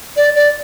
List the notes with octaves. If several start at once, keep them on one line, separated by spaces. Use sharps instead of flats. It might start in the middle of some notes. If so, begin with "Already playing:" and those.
D5
D5